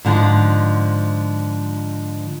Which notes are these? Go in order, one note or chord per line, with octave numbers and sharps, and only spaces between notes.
G#2 D3 F3